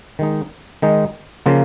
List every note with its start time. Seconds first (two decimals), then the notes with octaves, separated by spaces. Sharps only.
0.19 D#3 G#3 D#4
0.82 D#3 G#3 D#4
1.46 C#3 F3 A#3 F4 A#4